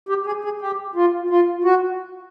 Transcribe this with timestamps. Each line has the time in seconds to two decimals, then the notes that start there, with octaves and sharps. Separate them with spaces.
0.09 G4
0.26 G#4
0.44 G#4
0.61 G4
0.95 F4
1.30 F4
1.64 F#4